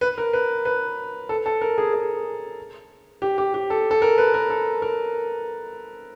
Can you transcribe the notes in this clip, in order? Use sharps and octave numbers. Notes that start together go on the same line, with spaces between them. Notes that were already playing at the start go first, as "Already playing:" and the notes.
B4
A#4
B4
B4
A4
A4
A#4
G#4
G#4
G4
G4
G4
A4
A4
A#4
B4
A#4
A4
A#4